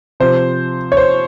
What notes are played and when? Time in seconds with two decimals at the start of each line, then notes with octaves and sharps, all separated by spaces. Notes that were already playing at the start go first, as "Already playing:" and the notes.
0.20 C3 F3 C5
0.92 C#5
0.97 C5